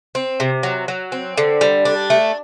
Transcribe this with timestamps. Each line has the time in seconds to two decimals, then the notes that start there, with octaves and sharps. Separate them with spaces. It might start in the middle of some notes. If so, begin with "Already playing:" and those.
0.15 C4
0.40 C3
0.63 F#3
0.88 F#3
1.12 C4
1.38 D3
1.61 G3
1.85 D4
2.10 A3